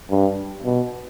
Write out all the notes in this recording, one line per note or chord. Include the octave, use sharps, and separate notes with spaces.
G2
B2